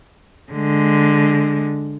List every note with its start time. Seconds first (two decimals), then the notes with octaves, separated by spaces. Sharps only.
0.53 D3 G#3